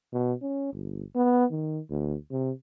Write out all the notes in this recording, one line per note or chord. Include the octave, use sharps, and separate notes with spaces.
B2
C#4
G1
B3
D#3
D2
C3